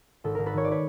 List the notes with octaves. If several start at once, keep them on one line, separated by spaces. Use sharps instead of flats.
G#1 A4
G#1 A#4
A4 B4
D#3 C#5
D5
B4 C#5